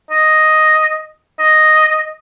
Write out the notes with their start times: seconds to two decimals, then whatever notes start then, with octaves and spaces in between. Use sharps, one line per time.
0.11 D#5
1.39 D#5